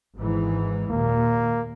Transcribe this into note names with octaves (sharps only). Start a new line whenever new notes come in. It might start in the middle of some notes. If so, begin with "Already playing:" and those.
G#1 G#2 E3
D#2 A#2 A#3